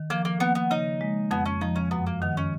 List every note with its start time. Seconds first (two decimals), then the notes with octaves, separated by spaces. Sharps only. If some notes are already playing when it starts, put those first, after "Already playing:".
Already playing: D#3
0.10 F3 A#3
0.25 A#3
0.40 A#3 B3
0.55 B3
0.71 C#3 D#4
1.01 G#3
1.31 F2 B3
1.46 C#4
1.61 F3 D#4
1.76 C#4
1.91 F#2 B3
2.06 A#3
2.22 D#3 B3
2.37 C#4